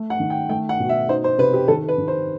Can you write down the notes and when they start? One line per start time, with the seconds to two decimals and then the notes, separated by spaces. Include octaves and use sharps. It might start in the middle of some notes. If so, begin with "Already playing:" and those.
Already playing: A3
0.10 F#5
0.20 D#3
0.30 G5
0.49 A3 G5
0.69 F#5
0.79 B2
0.89 E5
1.09 D#4 C5
1.24 C5
1.38 C3 B4
1.54 G4
1.68 D#3 A4
1.88 B4
1.98 D#3
2.08 C5